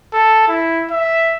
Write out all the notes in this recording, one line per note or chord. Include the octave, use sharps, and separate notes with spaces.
A4
E4
E5